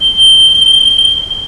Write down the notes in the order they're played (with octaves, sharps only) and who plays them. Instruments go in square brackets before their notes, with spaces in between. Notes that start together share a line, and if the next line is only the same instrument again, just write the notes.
[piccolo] G7